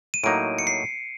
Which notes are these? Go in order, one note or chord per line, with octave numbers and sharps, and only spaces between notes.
D#7
A2 F#3 A#3 D#4 D7
C#7
C7